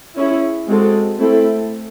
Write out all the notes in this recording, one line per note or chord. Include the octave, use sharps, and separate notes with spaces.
C#4 E4 G#4 C#5
G#3 C4 F#4 A4
A3 C4 E4 A4